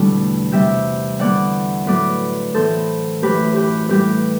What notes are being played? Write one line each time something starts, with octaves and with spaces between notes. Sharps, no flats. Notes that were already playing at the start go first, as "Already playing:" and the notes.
Already playing: E2 B2 D3 G3 A3 B3
C3 G3 B3 E5 G5
E2 D3 G3 B3 D5 F#5
A2 F#3 B3 B4 D5
A2 E3 B3 A4 C5
F#2 E3 A3 G4 B4
G4 B4
A2 G3 B3 G4 B4